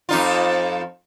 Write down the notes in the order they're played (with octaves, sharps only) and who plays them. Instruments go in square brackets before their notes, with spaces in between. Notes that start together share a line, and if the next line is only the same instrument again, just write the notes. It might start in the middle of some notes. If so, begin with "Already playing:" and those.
[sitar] F2 D#4 F4